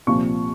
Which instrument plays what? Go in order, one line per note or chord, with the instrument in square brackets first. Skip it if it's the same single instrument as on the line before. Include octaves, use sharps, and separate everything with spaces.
[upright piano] C2 A#2 F3 C#6